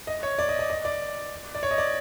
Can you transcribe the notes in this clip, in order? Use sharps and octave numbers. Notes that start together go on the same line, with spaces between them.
D#5
C#5
D5
D#5
D#5
D#5
D5
D5
C#5
D#5
D5